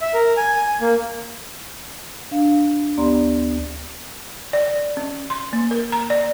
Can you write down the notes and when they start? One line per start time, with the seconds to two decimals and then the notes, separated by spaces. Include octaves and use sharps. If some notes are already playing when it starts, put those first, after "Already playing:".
0.01 E5
0.14 A#4
0.37 G#5
0.56 G#5
0.81 A#3
2.31 D4 F5
2.98 D2 B3 G4 D5 A#5 C6
4.53 D5
4.97 C#4
5.30 C6
5.53 A#3
5.71 A#4
5.92 A#5
6.10 D5